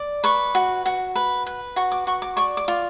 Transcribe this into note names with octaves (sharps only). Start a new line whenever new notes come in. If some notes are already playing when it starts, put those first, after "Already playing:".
Already playing: D5
B4 C#6
F#4
F#4
B4
B4
F#4 C#6
D6
F#4 C#6
D6
D5 C#6
D6
F4